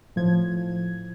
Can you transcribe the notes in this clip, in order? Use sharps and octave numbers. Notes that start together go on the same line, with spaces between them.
A2 F3 G#6